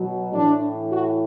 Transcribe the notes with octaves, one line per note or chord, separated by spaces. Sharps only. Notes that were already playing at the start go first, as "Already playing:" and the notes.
Already playing: B2 F#3
A2 E3 D4
F#4